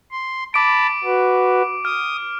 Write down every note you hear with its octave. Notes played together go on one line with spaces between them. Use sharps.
C6
A5 B5 D6 D7
F#4 B4
D#6 F6